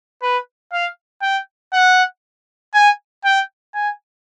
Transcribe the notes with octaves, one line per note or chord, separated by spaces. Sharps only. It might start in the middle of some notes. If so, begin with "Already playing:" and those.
B4
F5
G5
F#5
G#5
G5
G#5